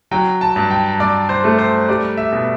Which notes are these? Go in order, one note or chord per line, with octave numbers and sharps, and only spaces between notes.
F#3 G5
A5
G2
G5
G2 D5
C5
A3
C5
G3 D5
E5
B2